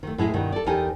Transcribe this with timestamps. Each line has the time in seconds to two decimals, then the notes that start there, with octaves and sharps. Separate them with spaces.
0.03 D#3 A3
0.18 A2 G#3 E4 G#4
0.33 G2 B2 D#3
0.52 A4 D5
0.66 E2 D#4 G4 A4 A#4 G#5